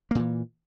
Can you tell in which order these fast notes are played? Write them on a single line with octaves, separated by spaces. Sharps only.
A#3 A#2 E3